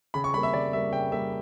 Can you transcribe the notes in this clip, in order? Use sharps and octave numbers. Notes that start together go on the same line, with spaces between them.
C#3 B5
C#6
G3 A#3 B5
E5
C#3 D5
G3 A#3 E5
C#3 G5
G3 A#3 E5